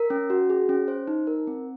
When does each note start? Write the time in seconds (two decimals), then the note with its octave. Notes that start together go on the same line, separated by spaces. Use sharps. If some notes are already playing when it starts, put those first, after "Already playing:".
Already playing: A#4
0.10 C#4
0.30 F#4
0.50 G#4
0.69 C#4
0.88 C5
1.07 D#4
1.27 A#4
1.47 C4